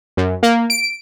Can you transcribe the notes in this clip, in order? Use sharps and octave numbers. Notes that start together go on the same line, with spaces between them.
F#2
A#3
D7